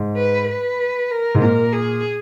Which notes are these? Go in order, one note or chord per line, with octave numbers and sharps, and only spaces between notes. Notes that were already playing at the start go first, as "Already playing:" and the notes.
Already playing: G#2
B4
B4
A#4
G#2
A#2 A#4
G#4